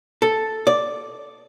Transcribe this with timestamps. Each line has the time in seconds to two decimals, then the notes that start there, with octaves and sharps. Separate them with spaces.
0.22 A4
0.67 D5